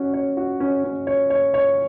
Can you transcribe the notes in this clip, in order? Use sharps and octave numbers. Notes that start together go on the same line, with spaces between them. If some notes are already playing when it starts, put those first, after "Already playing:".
Already playing: C#4 F#4
C#5
F#4
C#4
C#4
C#5
C#5
C#5